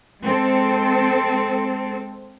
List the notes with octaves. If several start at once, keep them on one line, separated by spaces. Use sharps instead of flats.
G#3 C4 A4